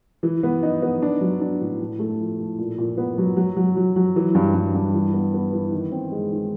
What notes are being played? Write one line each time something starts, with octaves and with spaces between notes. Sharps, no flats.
E3
B3
D#4
B3
D4
F#3
D4
A2
A2
A3
F3
A2
A#2
A#2
B3
F#3
F#3
F#3
F#3
F#3
E3
G2
G2
G2
E3
B3
B3
E3
D#3
C4
G#3
D#3